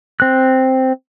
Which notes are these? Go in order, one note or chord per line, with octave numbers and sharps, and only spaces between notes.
C4 F#6